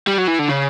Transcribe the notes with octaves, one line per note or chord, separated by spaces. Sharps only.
G3
F#3
E3
D3
C#3